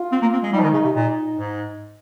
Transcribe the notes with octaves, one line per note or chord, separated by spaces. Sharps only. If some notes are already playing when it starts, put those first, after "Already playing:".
Already playing: F4
C4
A#3
C4
G#3
G3 D#4
F3
D#3
C#3
C3
A#2 D#4
G#2